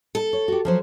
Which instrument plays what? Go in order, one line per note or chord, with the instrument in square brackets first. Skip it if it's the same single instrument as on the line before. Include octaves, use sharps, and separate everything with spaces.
[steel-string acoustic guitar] A4
[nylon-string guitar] C#5
F#4 G4
F3 F#3 C5